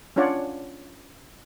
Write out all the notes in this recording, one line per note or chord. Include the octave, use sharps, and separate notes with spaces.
C#4 D4 F4 C#5 D5 F#5